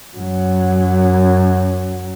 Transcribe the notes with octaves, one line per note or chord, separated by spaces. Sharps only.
F#2 F#3